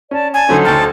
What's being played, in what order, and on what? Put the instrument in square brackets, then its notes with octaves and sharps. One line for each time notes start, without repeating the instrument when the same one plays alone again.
[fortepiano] C#4 [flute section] D5 A5
[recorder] G#5 [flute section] A5
[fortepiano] D3 F#3 C#4 [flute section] D#4 A4 C5
[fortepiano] D2 G5 F6 [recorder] A5